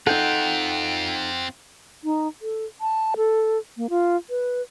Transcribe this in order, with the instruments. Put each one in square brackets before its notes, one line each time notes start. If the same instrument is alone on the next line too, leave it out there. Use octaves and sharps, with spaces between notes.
[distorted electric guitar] C4 F4 [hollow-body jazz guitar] D#4 A4 [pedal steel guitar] F#5 G5
[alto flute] D#4
A4
A5
A4
A#3
F4
B4